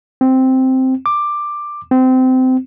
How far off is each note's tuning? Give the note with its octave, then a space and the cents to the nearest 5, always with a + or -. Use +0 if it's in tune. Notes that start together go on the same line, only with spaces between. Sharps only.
C4 -5
D6 +10
C4 -25